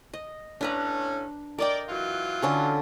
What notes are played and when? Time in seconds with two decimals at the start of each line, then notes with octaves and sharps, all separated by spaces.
0.14 D#5
0.61 A2 C#4 D4 B4 A#5
1.58 A#4 D5 D#5 G5
1.89 E3 F#3 F4
2.42 D3 C#4 A4